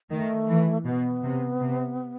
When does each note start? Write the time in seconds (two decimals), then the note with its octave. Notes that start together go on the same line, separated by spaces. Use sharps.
0.10 D#3 A3
0.48 E3
0.85 B2 B3
1.23 C3
1.60 C3